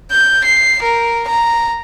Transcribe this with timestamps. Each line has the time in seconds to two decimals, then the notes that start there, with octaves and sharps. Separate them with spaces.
0.12 G6
0.45 C7
0.82 A#4
1.28 A#5